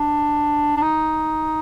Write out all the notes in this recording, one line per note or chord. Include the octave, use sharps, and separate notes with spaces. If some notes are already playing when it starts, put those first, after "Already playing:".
Already playing: D4
D4
D#4